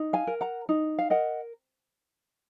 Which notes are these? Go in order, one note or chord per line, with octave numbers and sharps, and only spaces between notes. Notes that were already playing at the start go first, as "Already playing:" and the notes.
Already playing: D#4
F5 G#5
A#4
F#5 A#5
D#4
F5
A#4 D#5 F#5